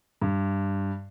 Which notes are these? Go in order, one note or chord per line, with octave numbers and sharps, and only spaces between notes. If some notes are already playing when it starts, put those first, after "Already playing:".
G2